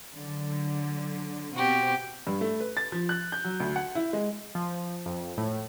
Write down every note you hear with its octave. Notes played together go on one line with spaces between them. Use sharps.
D3 F#3
B2 C4 F#4 G4
G2
A3
B4
A6
F3
F#6
G6
F#3
D2
F#5
E4
G#3
F3
F2
A2